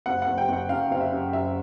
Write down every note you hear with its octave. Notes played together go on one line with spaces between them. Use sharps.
F#1 F#5
F#5
F#1
G5
F#1 F#5
F#2 F5
F#1 F5
E5
F#2
F#2 E5